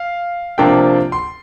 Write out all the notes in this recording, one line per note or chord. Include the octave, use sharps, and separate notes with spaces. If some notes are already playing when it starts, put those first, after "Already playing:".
Already playing: F5
C3 F3 A#3 D4 G5
C6